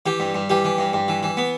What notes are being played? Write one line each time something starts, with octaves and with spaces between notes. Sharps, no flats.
E3 G4
G2
G2
E3 G4
E3
G2
G2
E3
E3
B3